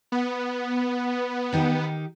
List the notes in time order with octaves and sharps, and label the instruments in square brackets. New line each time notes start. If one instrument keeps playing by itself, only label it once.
[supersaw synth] B3
[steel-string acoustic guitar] D#3 D#4 G4